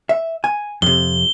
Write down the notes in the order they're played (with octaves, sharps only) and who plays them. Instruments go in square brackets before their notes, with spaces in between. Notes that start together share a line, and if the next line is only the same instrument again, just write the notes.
[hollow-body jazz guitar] E5
G#5
[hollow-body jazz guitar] F2 C3 [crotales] G7